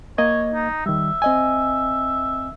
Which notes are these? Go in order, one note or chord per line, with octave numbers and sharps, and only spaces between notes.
A#3 C#5 D#5 G#6
D#4
D#3 G3 E5
C4 D#5 G#5